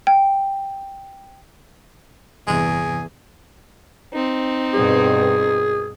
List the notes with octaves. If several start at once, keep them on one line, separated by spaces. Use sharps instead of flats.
G5
D#1 E2 G2 C3 G#4
C4 D#4
G2 B2 G#4